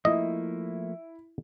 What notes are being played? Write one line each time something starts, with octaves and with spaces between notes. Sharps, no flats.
F3 A3 A#3 E4 D#5